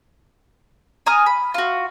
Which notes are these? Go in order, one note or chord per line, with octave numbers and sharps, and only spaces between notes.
G#5 A#5 D#6 F6
B5
F4 F#4